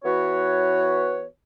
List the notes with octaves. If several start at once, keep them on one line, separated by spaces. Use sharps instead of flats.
E3 B3 F#4 B4 C#5